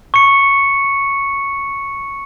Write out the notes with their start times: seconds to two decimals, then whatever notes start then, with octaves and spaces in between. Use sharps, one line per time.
0.14 C#6 C#7